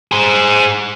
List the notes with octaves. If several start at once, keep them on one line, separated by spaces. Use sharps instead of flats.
G#4 C5